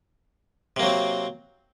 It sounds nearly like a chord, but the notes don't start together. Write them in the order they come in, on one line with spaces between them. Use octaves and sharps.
C3 A#3 F#3 C4